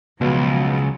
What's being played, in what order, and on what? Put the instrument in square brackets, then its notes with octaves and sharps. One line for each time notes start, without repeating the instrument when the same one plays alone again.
[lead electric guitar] C#2 [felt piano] B2 [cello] F3 F#3